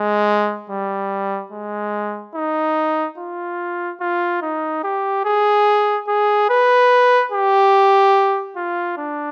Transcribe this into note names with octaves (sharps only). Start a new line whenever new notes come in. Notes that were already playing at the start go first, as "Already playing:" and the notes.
Already playing: G#3
G3
G#3
D#4
F4
F4
D#4
G4
G#4
G#4
B4
G4
F4
D4